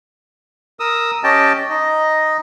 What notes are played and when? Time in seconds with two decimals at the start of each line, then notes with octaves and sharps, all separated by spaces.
0.80 A#4 D#6 E6
1.24 C#4 G4 D#5 G5 A5
1.70 D#4 D#5